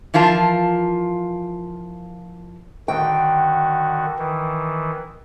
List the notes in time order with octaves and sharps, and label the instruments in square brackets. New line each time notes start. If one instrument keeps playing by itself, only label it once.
[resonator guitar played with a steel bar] E3 F3 F4 A#4 A5
[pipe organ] D3 D#3 F#4 [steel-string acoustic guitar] G5
[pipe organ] D#3 E3